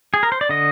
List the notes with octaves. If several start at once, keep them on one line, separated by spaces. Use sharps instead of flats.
G#4
A#4
C5
D5
D3 D#5